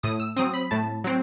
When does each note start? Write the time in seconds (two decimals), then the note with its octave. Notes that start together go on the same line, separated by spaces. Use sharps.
0.03 A2 D#6
0.20 E6
0.36 F#3 C4 D#6
0.54 B5
0.71 A2 A5
1.04 F#3 C4